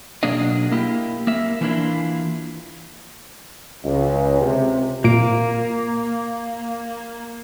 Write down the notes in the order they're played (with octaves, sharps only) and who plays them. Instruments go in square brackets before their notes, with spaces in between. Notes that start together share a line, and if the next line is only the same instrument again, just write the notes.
[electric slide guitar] B2 F#3 A#3 D4 G#4 D#5
A#3 E4 G4
A#3 E5
E3 A3 A#3 D4 E4 F4
[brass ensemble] C#2
C3
[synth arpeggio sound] A#2 D7 [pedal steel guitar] A#3